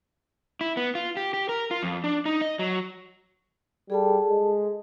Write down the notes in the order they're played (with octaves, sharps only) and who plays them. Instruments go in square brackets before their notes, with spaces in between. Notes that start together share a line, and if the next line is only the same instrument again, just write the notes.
[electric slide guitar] E4
B3
F4
G4
G4
A#4
F4
F2
D4
D#4
D#5
F#3
[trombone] G3 [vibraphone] G#4 A4 A5
[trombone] G#3